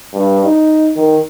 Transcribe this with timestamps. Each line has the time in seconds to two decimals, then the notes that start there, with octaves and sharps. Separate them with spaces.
0.14 G2
0.44 D#4
0.96 D#3